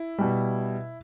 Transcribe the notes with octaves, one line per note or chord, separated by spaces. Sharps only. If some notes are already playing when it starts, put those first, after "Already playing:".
Already playing: E4
B2 G3